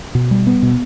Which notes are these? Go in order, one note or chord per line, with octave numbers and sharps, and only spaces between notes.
B2
G3
B3
B2